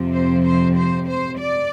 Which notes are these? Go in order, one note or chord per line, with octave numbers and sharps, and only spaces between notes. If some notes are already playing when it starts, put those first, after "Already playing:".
Already playing: F2 C3 F3 C4
C5
C5
C5
C5
D5